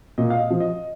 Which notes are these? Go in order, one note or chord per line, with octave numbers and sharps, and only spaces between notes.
A#2 D#5
F5
D#5
F3
D#5